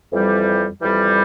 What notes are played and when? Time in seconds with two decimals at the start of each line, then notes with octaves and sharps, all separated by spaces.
0.13 F2 E3 G3
0.81 F2 E3 G3